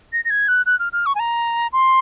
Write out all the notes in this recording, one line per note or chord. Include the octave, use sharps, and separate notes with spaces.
A#6
A#6
G#6
F#6
F#6
F6
F6
C#6
G#5
A#5
C6